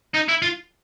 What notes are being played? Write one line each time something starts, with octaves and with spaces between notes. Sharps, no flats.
D#4
E4
F4